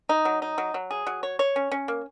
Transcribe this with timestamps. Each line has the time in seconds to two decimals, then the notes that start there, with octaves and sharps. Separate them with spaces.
0.09 D#4
0.25 F#3
0.42 D#4
0.58 F#3
0.74 F#3
0.91 G#4
1.07 F#3
1.23 C#5
1.39 C#5
1.56 C#4
1.72 C#4
1.88 A#3